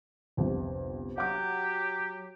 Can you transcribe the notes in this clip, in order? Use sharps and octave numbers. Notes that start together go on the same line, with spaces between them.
G1 C2 F2
F#3 G4 F#5 D6